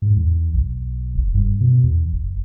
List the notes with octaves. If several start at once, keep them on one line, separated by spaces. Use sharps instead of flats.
G#2
E2
B1
F1
G2
B2
E2
F#1